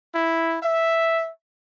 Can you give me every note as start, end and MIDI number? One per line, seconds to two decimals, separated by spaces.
0.14 0.57 64
0.63 1.29 76